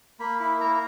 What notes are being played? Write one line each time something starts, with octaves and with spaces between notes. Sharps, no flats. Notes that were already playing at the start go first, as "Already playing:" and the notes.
A#3 B5
E4 B5
A#3 A#5